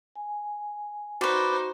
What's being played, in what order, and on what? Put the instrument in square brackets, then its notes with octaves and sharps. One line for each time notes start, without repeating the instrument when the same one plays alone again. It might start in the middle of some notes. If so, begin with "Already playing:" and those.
[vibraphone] G#5
[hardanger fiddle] D#4 C5 [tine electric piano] F#4 C#6 [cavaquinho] B4 D5